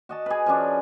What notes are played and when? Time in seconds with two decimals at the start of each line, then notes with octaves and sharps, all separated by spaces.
0.09 F#4 D#5 A5
0.26 G#4 B4
0.46 F3 C#4 D4